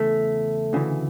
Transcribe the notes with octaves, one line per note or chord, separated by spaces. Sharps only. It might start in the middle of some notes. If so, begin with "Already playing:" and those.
Already playing: E2 C#3 E3 A3
D2 C#3 E3